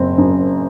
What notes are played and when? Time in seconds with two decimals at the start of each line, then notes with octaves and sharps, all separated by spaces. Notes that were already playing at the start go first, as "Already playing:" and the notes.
Already playing: F#1 C4
0.18 F#2